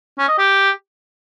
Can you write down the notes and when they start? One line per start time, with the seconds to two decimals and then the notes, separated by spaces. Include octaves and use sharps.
0.18 C#4
0.28 D#5
0.38 G4